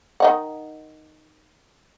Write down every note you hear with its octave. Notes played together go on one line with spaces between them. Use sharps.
D#3 D#4 F#5